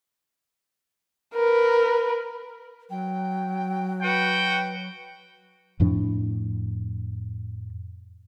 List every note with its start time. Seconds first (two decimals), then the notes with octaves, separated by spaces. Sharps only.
1.35 A#4 B4
2.90 F#3 G5
4.03 F#4 B4 G5
5.80 F2 A2 F3 D4